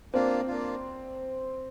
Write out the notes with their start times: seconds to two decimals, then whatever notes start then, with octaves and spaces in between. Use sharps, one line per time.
0.14 A#3 C4 D4 F4
0.47 A#3 D4 F4